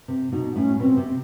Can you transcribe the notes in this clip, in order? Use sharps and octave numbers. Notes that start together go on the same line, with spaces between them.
C3
B2 D#4
A2 C#4
B2 C4
C3